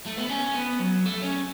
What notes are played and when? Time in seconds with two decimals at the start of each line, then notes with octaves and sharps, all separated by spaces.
0.06 A3
0.17 B3
0.29 C#4
0.54 B3
0.79 F#3
1.06 A3
1.22 C#4